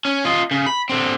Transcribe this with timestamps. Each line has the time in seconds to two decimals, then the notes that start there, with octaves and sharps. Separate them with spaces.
0.05 C#4
0.25 F4 D#5
0.51 C#3
0.66 B5
0.89 D3 C4